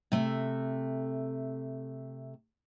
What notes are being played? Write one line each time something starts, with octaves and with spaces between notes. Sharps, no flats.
C3 A3